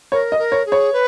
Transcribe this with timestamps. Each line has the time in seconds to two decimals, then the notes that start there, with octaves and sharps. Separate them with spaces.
0.12 A#4 C#5
0.32 D#5
0.38 A#4
0.52 C#5
0.66 G#4
0.72 C#5
0.92 B4